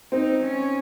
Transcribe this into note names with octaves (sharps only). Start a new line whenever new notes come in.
C4 D#4
C#4